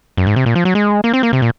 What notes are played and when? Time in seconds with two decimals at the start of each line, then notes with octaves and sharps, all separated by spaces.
0.17 F#2
0.27 G#2
0.36 C3
0.46 A#2
0.55 F3
0.65 F#3
0.75 G#3
1.04 A#3
1.14 C4
1.23 A#3
1.33 C3
1.42 A#2